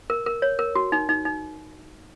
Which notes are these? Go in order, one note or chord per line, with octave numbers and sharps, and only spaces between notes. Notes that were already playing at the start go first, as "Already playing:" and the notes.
A#4
A#4
C#5
A#4
F#4
D#4
D#4
D#4